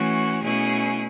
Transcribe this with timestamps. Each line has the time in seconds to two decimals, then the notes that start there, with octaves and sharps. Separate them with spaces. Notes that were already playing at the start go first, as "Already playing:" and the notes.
Already playing: E3 A3 C#4 F#4
0.43 B2 A3 C#4 E4 G#4